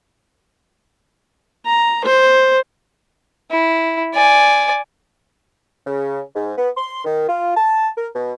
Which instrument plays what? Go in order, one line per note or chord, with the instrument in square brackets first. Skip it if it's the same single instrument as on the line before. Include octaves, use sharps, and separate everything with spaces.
[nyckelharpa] A#5
C5
[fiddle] E4
D5 G#5
[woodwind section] C#3
G#2
B3
C6
D#3
F4
A5
A#4
B2